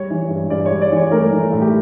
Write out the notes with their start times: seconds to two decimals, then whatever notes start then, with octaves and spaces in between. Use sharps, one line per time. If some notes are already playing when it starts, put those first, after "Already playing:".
Already playing: G3 C#5
0.10 E3
0.30 G2
0.50 G2 D5
0.66 C#5
0.71 G3
0.82 D5
0.92 E3 C#5
1.11 A3 A#4
1.32 E3
1.53 A2
1.62 G4